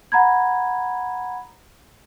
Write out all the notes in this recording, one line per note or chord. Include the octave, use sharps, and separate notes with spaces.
F#5 A#5 B5 G#6